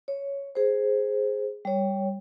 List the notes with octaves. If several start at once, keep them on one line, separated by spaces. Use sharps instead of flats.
C#5
G#4 C5
G3 C#5